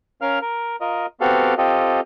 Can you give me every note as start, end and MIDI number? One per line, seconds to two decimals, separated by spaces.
0.22 0.39 61
0.22 0.39 70
0.22 0.39 77
0.22 0.39 89
0.42 0.76 70
0.81 1.06 65
0.81 1.06 70
0.81 1.06 75
1.20 1.54 59
1.20 1.54 60
1.20 1.54 66
1.20 1.54 67
1.20 1.54 69
1.20 1.54 77
1.58 2.00 60
1.58 2.00 65
1.58 2.00 67
1.58 2.00 69
1.58 2.00 75